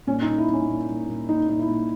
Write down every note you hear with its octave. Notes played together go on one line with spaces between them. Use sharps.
A#2 C#4
D#4
A#2
E4
A#2
C#4
A#2
A#2
A#2
A#2 D#4
A#2 D#4
E4
A#2